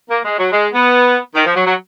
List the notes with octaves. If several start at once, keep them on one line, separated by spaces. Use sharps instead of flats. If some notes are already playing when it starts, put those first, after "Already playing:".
A#3
G#3
F#3
G#3
B3
D#3
F3
F#3
F#3